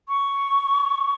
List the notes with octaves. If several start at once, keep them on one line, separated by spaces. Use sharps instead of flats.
C#6